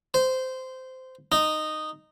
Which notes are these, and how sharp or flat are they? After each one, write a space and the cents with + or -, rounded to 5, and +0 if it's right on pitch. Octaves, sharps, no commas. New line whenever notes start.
C5 -15
D#4 -10